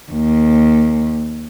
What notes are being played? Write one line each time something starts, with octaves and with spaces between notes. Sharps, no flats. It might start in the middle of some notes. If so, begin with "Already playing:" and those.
D#2